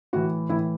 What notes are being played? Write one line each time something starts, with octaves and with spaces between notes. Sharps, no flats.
A2 E3 F#4
A2 E3 E4